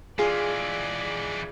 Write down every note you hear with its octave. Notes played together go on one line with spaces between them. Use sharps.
E3 G#3 F4 G#4 D5